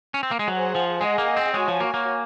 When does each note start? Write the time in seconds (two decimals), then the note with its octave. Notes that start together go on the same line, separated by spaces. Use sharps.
0.14 C#4
0.23 C4
0.31 A#3
0.39 G#3
0.48 F#3 G#4 C5 F#5
0.75 F3
1.00 G#3 G#4 D#5 F#5
1.18 A#3
1.37 C4
1.54 G#3 F#4 C#5 G#5
1.68 F3
1.80 A#3
1.94 A#3